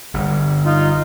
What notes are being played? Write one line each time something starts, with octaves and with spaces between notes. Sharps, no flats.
G1 G2
D#4 F4